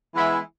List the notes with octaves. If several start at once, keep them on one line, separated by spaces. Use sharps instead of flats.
E3 G#3 B3 E4